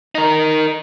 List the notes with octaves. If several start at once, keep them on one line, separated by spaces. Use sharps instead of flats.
D#4 A#4